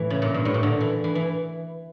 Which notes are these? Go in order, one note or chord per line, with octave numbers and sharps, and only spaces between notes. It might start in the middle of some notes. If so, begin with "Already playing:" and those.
Already playing: A2 E3
C#3
A#2
G2
A2
A#2
D3
E3
E3
E3